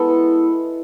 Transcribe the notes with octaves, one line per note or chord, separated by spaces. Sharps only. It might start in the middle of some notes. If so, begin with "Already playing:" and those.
Already playing: G#3 B3 E4 A4